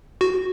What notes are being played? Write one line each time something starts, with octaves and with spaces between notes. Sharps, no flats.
F#4